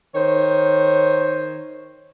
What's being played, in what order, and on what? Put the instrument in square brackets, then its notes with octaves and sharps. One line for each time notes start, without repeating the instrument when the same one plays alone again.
[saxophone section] D#3 C5 C#5